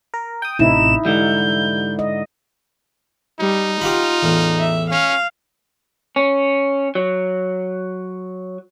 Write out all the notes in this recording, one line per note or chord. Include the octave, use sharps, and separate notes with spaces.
A#4
G5 D#6
A1 C3 D#4 E4 E7
G#2 D3 E3 G3 G6
D#5
G3 D#4
F4 G4 F#5 B5
E2 A2
E5
C#4 F5
C#4
F#3